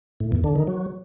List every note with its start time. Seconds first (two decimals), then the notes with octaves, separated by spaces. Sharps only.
0.20 A2
0.32 E2
0.44 D3
0.56 D#3
0.67 F#3